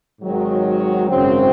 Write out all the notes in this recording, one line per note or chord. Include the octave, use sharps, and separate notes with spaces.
G#1 G#2 D#3 F#3
G#1 F#2 C#3 F#3 C4